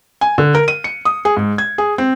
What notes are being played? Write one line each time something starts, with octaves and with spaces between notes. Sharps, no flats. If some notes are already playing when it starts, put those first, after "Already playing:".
G#5
D3
A#4
D#7
C#7
D#6
G#4
G#2
G#6
G#4
C4